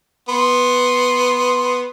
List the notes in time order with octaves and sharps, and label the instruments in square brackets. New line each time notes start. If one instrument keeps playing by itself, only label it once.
[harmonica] B3 C6